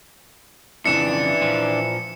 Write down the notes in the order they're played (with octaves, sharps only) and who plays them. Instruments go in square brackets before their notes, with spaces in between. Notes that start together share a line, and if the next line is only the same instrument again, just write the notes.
[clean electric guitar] F2 A2 C#3 [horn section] E3 [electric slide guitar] D4 [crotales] C#7 E7
[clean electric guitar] A#2 F3